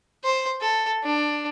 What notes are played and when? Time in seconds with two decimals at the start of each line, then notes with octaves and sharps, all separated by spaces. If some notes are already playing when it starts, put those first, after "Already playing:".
0.24 C5
0.61 A4
1.04 D4